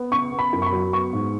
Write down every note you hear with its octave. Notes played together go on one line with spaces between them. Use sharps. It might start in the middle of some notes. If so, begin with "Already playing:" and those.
Already playing: B3
C#3 C#6
B3
B5
F#2
C#6
B5
F#3
B3 C#6
G#2